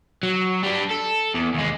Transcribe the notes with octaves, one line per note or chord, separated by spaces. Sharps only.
F#3
G3 D4
A4
E2
D#2 G#3